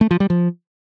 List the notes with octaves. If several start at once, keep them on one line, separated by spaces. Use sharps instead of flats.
A3
F3
G3
F3